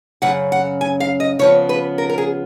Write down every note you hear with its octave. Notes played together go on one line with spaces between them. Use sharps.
F#2 C#3 F#5
F#5
G#5
F5
D#5
C#3 F3 B3 C#5
B4
A#4
A#4
G#4